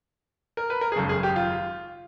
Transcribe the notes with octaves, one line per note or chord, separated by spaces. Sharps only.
A#4
B4
A#4
G#4
G#1 F#2 C#3 A4
G#4
G4
F4